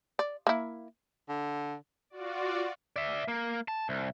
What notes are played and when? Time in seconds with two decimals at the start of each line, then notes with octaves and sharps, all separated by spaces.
0.19 D5
0.47 A#3 E4
1.29 D3
2.10 F4 F#4 D5
2.96 D5 E5
3.28 A#3
3.68 A5
3.89 C2